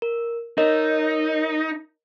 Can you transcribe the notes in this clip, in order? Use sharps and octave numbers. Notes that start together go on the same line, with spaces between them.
A#4
D#4 A#4 C#5 D#5